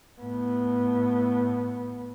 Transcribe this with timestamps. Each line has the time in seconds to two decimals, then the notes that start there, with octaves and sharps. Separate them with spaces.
0.21 A2 B3